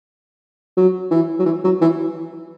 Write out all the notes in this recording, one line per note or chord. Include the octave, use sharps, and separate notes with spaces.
F#3
E3
F#3
E3
F#3
E3